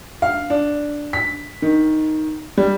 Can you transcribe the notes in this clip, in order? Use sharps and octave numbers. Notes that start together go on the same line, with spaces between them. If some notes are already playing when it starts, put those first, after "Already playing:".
F5
D4
B6
D#3
G3